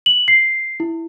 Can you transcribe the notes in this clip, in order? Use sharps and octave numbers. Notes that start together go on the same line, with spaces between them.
F#7
C7
E4